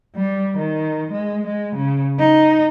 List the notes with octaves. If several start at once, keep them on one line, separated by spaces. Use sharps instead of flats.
G3
D#3
G#3
G#3
C#3
D#4